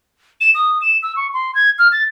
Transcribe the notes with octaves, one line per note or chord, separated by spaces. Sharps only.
E7
D#6
E7
E6
C#6
C6
G#6
F6
A6